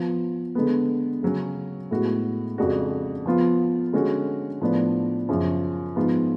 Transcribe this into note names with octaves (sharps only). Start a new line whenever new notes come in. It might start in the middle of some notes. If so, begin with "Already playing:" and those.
Already playing: F3 B3 F4
D3 G#3 B3
C#3 F#3 C#4
A2 G#3 B3 F#4
F2 C#3 G#3 D4 F#4
F3 B3 F4
D3 G#3 C#4 F#4
A2 F3 B3 D4
F#2 C#3 F3
G#2 F3 B3 F4